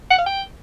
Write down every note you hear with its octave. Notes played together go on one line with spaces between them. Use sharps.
F#5
F5
G5